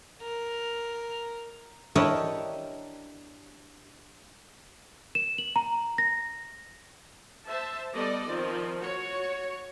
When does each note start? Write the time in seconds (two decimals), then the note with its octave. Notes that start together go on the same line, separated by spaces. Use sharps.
0.22 A#4
1.95 D4 E4 G4 A#4 C#5 D#5
5.15 E7
5.38 F#7
5.56 A#5
5.98 A#6
7.47 C5 E5 A5
7.95 G3 B3 A4 D5 D#5
8.26 D#3 F3 C4
8.78 F#4 C#5